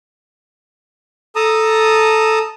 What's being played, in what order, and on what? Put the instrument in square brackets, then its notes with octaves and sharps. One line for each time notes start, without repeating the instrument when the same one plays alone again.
[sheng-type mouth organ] A4 A5 A#5 D#6